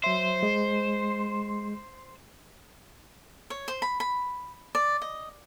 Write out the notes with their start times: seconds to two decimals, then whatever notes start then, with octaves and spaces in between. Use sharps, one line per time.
0.04 F#3 C5 E5
0.43 G#3
3.50 C#5
3.68 C5
3.82 B5
4.00 B5
4.75 D5
5.02 D#5